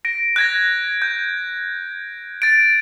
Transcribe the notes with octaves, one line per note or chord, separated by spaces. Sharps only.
A#6 D7
F#6 G#6 A#6
G6
A6 D7